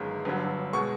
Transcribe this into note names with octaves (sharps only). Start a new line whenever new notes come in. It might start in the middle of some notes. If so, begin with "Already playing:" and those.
Already playing: G1 F#2 D#3 G#3
G1 G2 D3 F#3
B2 G#3 C#6